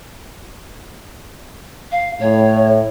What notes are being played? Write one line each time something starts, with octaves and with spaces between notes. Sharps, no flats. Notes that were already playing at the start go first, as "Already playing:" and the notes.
F5
A2 C#5